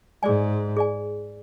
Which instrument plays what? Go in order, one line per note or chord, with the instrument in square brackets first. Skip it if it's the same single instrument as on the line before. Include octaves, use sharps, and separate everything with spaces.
[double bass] G#2 [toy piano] G#4 D5 G#5
[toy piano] G#4 D5 G#5